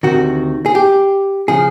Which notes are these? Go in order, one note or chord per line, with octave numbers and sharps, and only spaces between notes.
D2 C3 D#3 F#4
G#4
G4
C#3 F3 G#4